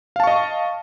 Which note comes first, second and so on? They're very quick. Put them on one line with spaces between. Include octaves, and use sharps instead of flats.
F5 A5 C#6 D#5